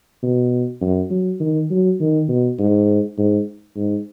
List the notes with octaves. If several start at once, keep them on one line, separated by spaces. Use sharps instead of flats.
B2
F#2
F#3
D#3
F#3
D#3
B2
G#2
G#2
G#2